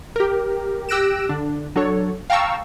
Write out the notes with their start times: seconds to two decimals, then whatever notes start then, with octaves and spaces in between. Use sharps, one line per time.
0.16 G4 A#4
0.89 G4 E6 F#6 A#6 D7 E7
1.29 D3 D4
1.76 F#3 D4 A4 C#5
2.30 F5 G5 A5 A#5 C#6 E6